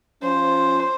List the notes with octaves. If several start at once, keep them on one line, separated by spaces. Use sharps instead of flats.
F3 C#4 C5